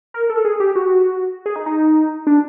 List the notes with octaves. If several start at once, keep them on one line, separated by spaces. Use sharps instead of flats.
A#4
A4
G#4
G4
F#4
G#4
D#4
D#4
D4